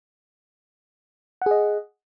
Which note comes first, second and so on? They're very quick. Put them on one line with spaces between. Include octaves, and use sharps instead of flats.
F#5 G#4 D#5